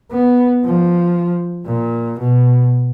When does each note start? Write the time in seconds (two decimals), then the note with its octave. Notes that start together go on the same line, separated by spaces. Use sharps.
0.12 B3
0.65 F3
1.66 A#2
2.19 B2